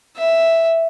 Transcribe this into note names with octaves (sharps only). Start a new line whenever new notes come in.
E5